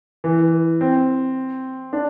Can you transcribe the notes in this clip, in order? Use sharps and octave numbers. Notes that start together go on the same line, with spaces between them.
E3
C4
D4